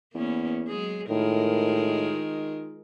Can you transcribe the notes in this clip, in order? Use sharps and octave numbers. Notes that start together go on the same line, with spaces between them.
E2 A#3 B3 C#4
F#3 G#3 G#4
A2 D#3 G#3 F4 A#4